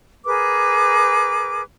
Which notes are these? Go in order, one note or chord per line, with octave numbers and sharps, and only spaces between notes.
G#4 A#4 B4 D6